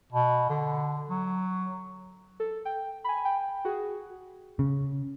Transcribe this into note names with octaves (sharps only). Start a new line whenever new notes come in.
B2
D3
F#3
A4
G5
G#5 B5
G5
F#4 G#4
C#3